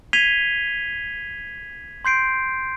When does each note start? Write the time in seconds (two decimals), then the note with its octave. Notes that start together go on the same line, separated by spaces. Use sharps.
0.13 G#6 B6 C7 D#7 F7 G7
2.05 C6 G6 C7 D7